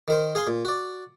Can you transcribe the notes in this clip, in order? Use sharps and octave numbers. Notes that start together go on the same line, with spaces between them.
D#3 A#4 C5
G#4 F5 G#5 C6
A#2
F#4 D5